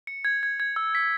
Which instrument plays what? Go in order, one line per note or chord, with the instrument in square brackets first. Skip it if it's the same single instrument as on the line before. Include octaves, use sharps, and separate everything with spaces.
[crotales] C#7
G#6
G#6
G#6
E6
B6